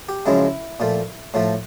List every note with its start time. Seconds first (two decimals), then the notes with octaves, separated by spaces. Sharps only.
0.09 G4
0.26 F#2 C#3 F3 G#3 E4
0.80 A#2 F3 A3
1.34 A2 F3 A3